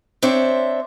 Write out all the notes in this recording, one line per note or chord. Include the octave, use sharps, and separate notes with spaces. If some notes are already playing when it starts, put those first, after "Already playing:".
C4 D4 C5 C#5 E5